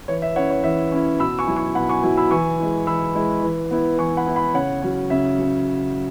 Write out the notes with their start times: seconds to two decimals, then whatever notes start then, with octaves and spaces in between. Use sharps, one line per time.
0.08 E3 C#5
0.22 E5
0.36 C#4 E4 C#5 F#5
0.50 C#5
0.64 E3 E5
0.92 C#4 E4
1.20 B2 B5 E6
1.39 G#5 C#6
1.47 F#3 E4
1.57 G#5 C#6
1.75 B2 F#5 B5
1.89 G#5 C#6
2.03 F#3 E4
2.17 B5 E6
2.31 E3 G#5 C#6
2.60 G#3 E4
2.87 E3 B5 E6
3.15 G#3 E4
3.43 E3
3.71 B3 E4
3.98 E3 G#5 C#6
4.17 F#5 B5
4.26 B3 E4
4.36 F#5 B5
4.54 C#3 C#5 F#5
4.82 F#3 C#4
5.10 C#3 E5
5.38 F#3 C#4